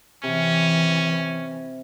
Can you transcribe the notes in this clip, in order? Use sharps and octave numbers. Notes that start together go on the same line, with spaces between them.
C3 E3 C#4